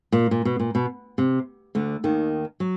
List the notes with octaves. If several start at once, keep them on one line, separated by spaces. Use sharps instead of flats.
A#2
A#2
B2
A#2
B2
C3
D2 D3
D#2 D#3
F#3